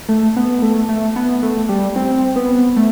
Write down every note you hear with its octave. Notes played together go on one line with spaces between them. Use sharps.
A3
B3
A3
A3
B3
A3
G3
C4
B3
A3